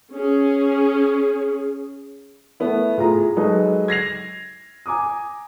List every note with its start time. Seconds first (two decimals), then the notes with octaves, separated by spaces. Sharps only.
0.13 C#4 G#4
2.60 A3 B3 E4
2.98 A2 F4 G#4 A#5
3.36 F#3 G#3 D#4 G#4 A4 B4
3.88 G#6 A#6 C7 F7
4.86 G#5 A#5 D6 D#6